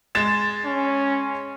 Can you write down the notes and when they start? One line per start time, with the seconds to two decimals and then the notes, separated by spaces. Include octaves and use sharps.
0.15 G#3 A6 E7
0.66 C#4